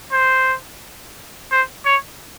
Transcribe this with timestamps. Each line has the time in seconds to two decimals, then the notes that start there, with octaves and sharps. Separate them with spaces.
0.12 C5
1.51 C5
1.85 C#5